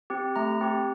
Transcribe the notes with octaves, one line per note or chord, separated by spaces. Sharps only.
C4 G4
A3 A#5
C4 G4